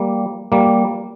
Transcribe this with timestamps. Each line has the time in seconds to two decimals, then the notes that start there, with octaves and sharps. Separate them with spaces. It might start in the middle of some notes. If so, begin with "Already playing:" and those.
Already playing: G3 A#3
0.52 G3 A#3